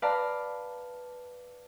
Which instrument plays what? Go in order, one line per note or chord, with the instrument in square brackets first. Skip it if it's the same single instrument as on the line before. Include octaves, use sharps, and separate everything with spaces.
[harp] B4 D5 F5 A5 A#5